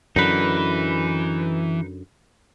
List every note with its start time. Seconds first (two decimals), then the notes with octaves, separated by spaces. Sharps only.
0.16 F#2 D3 E3 D#4 B4